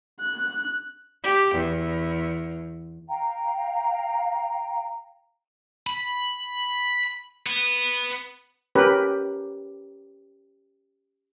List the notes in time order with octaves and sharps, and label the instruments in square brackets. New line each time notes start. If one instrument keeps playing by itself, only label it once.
[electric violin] F#6
[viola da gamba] G4
E2
[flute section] F5 G5 A#5
[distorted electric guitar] B5
B3
[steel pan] C#4 G4 A#4 B4